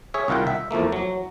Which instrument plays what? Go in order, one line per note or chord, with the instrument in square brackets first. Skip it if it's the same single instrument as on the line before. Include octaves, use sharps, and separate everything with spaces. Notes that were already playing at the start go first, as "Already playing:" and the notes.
[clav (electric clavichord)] G#4 C#5 E5
C2 D#3 F4 F#5 G5
E5
E2 F3 A3 A#3
F#3